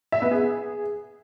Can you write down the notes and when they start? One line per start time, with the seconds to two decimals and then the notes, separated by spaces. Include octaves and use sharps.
0.12 E5
0.22 B3
0.31 G#4